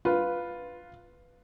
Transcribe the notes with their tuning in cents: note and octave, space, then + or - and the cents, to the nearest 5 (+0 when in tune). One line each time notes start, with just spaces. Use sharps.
F4 +0 B4 +0